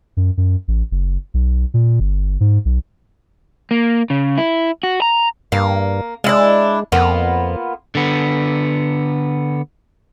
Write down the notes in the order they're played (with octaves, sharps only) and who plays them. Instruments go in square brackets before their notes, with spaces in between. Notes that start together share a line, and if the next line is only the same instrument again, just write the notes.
[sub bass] F#2
F#2
A1
F#1
B1
A#2
G1
G#2
B1
[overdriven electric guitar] A#3
C#3
E4
F#4
A#5
[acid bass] G2 [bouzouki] A#3
[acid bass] G#3 [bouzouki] D4 E4 F4
[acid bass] F2 [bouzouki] A#3 B3 F4
[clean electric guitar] D3 B3